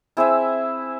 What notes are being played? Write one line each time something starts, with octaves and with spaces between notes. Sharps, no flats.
C4 E4 G#4 E5